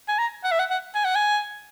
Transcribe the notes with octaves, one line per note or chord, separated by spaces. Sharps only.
G#5
A#5
F#5
E5
F#5
F#5
G#5
F#5
G#5